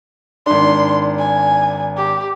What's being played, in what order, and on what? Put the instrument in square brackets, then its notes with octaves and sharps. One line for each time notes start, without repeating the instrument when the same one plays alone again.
[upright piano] G#1 D4 [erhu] C6
[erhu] G#5
G4